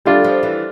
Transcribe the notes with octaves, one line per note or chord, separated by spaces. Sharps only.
G3 A3 D4 F4
F3
E3